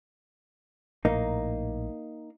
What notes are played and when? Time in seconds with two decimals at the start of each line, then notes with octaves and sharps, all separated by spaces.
1.05 A#1 A2 A#3 D#4